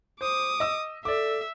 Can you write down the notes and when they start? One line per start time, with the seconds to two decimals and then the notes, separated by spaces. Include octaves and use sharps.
0.21 C5 D6 D#6
0.60 D#5 E6
1.05 A4 D5 E5 D6